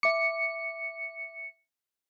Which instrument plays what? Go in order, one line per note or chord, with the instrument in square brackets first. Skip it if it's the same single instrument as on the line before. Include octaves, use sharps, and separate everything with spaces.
[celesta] E5 D6 [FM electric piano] C#7